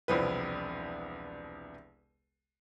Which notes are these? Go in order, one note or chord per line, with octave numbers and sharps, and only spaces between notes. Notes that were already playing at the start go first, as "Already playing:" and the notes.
E1 C2 F3 B4